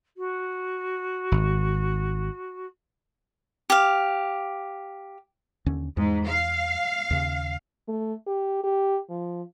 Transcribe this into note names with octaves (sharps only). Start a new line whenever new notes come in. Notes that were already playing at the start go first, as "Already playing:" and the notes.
F#4
G#1
G4 F5
D#2 D3 C#4
E2 G#2
F5
D#2 C#3
A3
G4
G4
F3